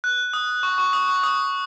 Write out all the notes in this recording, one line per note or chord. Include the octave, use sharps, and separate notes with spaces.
F#6
D#6
C#6
C#6
D#6
C#6
D#6